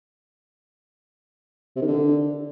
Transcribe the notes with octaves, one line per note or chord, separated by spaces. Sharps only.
C3
D#3
D3